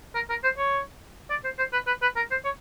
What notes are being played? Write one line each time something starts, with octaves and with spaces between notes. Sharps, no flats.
A#4
A#4
C5
C#5
D5
C5
C5
B4
B4
B4
A#4
C5
C#5